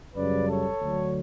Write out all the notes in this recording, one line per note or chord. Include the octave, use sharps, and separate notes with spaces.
F#2 C#3 G3 B4 D5
A4 C#5
D2 D3 F#3